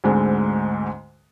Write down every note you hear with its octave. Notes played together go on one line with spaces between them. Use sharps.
D2 G#2 D3 G#3 C4